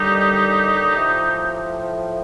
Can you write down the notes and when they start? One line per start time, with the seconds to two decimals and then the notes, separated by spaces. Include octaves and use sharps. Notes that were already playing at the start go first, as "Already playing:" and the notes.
Already playing: D#2 D3 G3 D#4 G4
0.96 A2 F3